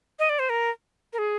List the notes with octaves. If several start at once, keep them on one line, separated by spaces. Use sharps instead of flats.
D#5
D5
C5
A#4
A#4
G#4